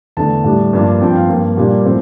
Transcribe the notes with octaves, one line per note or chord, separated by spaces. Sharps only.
E2 D3 A3 D4 A5
A2 G3 D4
G2 F3 A#3 D4
G2 F3 C4 G5
F5
G2 F3 A#3
A#2 G3 A#3 D4
A2 F3 C4 C5